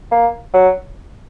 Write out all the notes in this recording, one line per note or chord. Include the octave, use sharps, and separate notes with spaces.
A#3
F#3